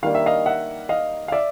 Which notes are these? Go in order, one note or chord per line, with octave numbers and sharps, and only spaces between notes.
D#3 G3 A#3 D4 F5
E5
D#5 F5
E5 F#5
D#5 F5
F5
D5 E5